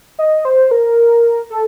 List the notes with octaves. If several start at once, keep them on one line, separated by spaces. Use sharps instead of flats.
D#5
C5
A#4
A4